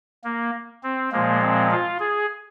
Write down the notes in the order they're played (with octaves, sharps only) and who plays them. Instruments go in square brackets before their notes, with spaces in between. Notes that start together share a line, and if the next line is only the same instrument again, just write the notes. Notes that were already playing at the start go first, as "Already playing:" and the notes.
[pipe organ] A#3
C4
A#2 F3 G#3 A#3
C4
F4
G#4